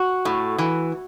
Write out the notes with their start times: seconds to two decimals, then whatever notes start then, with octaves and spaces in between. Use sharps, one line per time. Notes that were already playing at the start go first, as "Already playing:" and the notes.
Already playing: F#4
0.25 A2
0.58 E3